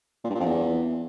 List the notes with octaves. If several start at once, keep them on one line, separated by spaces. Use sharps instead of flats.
A#2
G2
A#2
F2
E2